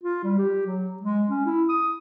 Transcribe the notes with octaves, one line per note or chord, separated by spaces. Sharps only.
F4
G3
G4
F#3
G#3
C#4
E4
D#6